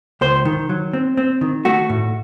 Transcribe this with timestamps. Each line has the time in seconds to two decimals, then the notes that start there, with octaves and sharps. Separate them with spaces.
0.21 C#2 C5
0.45 D#3
0.69 F#3
0.93 C4
1.17 C4
1.41 D#3
1.65 A3 F#4
1.90 A2